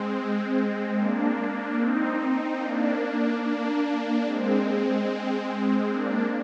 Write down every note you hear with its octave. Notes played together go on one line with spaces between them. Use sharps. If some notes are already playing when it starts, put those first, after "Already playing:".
Already playing: G#3 C4
A#3 D4
C4 D#4
A#3 D4
A#3 D4
G#3 C4
A#3 D4